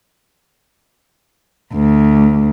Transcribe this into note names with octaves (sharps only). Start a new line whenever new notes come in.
D2